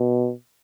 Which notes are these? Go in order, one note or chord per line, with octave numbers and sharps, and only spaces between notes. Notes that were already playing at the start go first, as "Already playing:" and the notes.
Already playing: B2